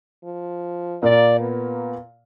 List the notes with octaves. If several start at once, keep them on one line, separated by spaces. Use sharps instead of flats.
F3
A#2 A#3 D5
B3